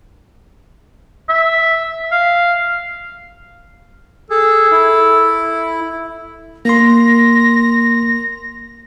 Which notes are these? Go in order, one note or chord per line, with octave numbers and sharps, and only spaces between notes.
E5
F5
G#4 A4
E4
A#3 C6 A#6